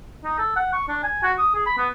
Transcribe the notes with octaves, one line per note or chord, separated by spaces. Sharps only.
D#4
A4
F#5
C#6
D4
G#5
F#4
D#6
G#4
B5
B3